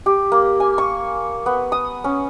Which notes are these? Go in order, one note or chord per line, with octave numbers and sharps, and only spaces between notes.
G4
A#3
G#5
C#6
B3
D#6
C#4